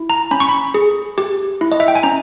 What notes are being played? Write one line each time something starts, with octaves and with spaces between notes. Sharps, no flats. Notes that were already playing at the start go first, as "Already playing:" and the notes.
Already playing: E4
A#5
C#4 B5
C#6
B5
G#4
G4
E4
D#5
E5
G5
G#5
C#4 A#5